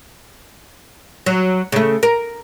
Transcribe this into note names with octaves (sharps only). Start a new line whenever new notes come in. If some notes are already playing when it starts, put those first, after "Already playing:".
F#3
C#3 A3
A#4